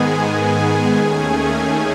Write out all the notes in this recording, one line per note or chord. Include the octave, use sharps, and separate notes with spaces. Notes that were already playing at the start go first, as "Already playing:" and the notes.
Already playing: G#2 D#3 G#3 B3 G#4 G#5
G#4 G#5
D#2 D#3 A3 C#4